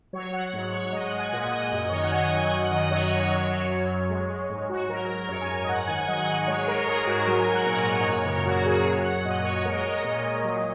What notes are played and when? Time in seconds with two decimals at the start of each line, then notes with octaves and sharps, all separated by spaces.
0.13 F#3 C#5
0.33 F#3 F#5
0.53 G#2 F#5
0.72 G#2 C#5
0.93 G#3 D#5
1.06 F#5
1.12 G#3
1.19 G#5
1.32 A#2 F#5
1.43 F#5
1.52 A#2 D#5
1.72 F#2 D#5
1.89 C#5
1.91 D#3 D#5
2.04 F#5
2.11 F#3 G#5
2.24 D#5
2.31 F#2 F#5
2.51 F#2 D#5
2.64 F#5
2.71 D#3 D#5
2.91 F#3 C#5
3.10 F#2 C#5
3.30 F#3 C#5
3.50 F#3
3.70 F#2
3.90 F#2
4.10 G#3
4.29 G#3
4.50 G#2
4.69 G#2 F#4
4.89 F#3 A#4
5.09 F#3 A#4
5.29 F#2 C#5
5.41 G#5
5.49 F#2
5.63 D#5
5.68 G#2 F#5
5.87 D#3 G#5
5.98 F#5
6.08 F#3 D#5
6.28 G#2
6.47 G#3 C#5
6.68 G#3 A#4
6.87 G#2 G#4
7.07 G#2 F#4
7.27 F#3 A#4
7.40 G#5
7.47 F#3
7.53 F#5
7.66 A#2 C#5
7.86 A#2 A#4
8.01 D#5
8.06 F#2 C#5
8.26 C#3 A#4
8.46 F#3 F#4
8.66 F#2 G#4
8.85 F#3 C#5
8.99 F#5
9.05 F#3
9.12 F#5
9.25 A#2 D#5
9.45 A#2 C#5
9.65 G#3 A#4
9.72 D#5
9.78 C#5
9.85 G#3
9.91 D#5
10.04 A#2
10.25 A#2
10.44 F#3